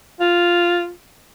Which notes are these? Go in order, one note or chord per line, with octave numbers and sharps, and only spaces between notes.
F4